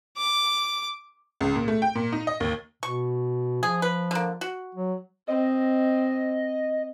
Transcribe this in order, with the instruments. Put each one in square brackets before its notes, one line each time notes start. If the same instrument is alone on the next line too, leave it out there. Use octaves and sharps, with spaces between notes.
[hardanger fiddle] D6
[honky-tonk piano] C#2
A#2
A3
G5
A#2
D#4
D#5
D#2
[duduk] B2 [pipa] C#6
[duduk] F3 [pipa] G#4
[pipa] B4
D3 A#3
F#4
[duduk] F#3
[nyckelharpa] C4 [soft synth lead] D#5